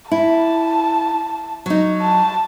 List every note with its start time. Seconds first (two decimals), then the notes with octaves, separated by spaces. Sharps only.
0.12 E4 A5
1.66 F#3 D#4
2.02 A5